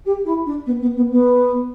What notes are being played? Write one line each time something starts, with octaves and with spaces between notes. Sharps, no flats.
G4
E4
D4
B3
B3
B3
B3